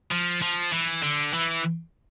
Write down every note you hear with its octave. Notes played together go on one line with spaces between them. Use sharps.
F3
F3
E3
D3
E3